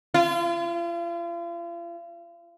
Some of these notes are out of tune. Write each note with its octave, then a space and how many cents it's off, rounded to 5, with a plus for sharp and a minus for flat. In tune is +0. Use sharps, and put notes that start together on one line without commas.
F4 -40